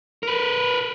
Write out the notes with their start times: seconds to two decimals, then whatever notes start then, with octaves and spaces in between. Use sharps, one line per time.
0.23 A#4 B4